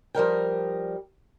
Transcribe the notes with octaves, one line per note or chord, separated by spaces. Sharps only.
F3 G3 A#4 G5